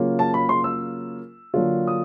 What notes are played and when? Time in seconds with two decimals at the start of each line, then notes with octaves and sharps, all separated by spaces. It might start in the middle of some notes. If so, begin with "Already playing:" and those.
Already playing: C#3 F#3 A#3 C#4 F4
0.19 A5
0.34 B5
0.49 C6
0.64 E6
1.54 D3 F#3 A#3 D4 F4
1.87 D#6